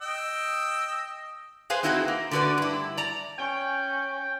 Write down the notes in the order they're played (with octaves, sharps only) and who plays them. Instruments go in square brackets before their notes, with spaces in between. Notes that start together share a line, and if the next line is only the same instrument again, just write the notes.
[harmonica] D#5 G5 E6
[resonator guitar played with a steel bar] G#4 B4 C5 F5 G#5
C4 D#4 E4 F#4 G#4 B4
A#3
D3 A3 F#4 G4 B4 D5
G2 E4
D5 A#5
[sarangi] C#4 [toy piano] D5 G#5 C#6 [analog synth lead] G5